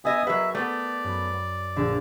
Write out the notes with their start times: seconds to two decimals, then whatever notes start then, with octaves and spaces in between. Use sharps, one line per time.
0.05 B3 D#5 E5 G#5 D#6
0.27 F#3 G#4 A#4 B4 E5 F#5
0.55 A3 B3 D5
1.04 F#2 B5
1.77 A#1 D3